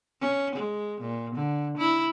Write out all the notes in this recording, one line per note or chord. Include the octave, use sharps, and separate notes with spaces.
C#4
G#3
A#2
D3
E4